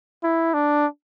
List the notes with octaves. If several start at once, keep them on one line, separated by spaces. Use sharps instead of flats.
E4
D4